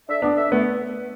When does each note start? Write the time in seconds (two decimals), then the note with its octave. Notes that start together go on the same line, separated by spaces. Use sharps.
0.08 D4 A4 E5
0.22 B3 D4
0.37 D4 A4 E5
0.51 A3 B3